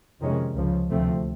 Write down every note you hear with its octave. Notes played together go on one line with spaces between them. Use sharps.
F2 C3 D#3 G#3 C#4
C#2 C#3 F3
D2 C3 F3 A3 C4